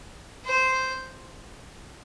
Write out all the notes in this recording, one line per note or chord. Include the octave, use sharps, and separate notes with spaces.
C5